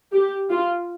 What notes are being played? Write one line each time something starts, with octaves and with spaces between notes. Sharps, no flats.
G4
F4